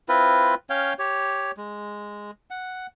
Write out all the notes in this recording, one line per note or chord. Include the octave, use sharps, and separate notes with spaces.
C4 E4 F4 B4
C#4 C#5 F5 G5
G4 C#5
G#3
F#5